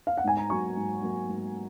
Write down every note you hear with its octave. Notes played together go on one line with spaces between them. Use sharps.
F5
F#5
G#2 G#5
A#5
F#3 A#3 C#6
G#2
F#3 A#3
G#2